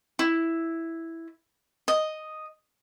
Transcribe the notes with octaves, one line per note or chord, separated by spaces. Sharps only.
E4
D#5